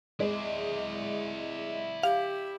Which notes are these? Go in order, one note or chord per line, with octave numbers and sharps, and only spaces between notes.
G#3 E4 D5
G4 F5